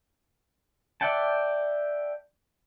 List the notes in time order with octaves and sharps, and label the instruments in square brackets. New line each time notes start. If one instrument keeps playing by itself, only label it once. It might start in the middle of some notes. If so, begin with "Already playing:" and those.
[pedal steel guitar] D5 E5 F#5 G5 A5